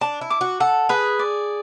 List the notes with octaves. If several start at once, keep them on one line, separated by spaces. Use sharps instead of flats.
D4 A5
E4
D6
F#4
A4 F#5
G#4 B4
D5